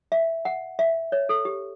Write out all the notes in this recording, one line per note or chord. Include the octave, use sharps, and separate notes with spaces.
E5
F#5
E5
C#5
A4
G4